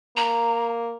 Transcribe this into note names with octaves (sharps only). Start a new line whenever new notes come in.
A#3 A#5